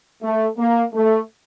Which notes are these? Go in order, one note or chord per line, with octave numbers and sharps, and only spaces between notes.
A3
A#3
A3